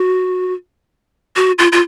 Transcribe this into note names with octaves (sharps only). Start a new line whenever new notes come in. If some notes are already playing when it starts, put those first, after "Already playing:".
Already playing: F#4
F#4
F4
F4